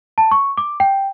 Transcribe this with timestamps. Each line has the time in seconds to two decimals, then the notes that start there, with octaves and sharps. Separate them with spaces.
0.18 A5
0.31 C#6
0.58 D6
0.80 G5